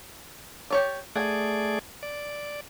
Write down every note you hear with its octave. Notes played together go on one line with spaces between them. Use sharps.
G4 C#5 D5
A3 G#4 D5 F#5 G#5
D5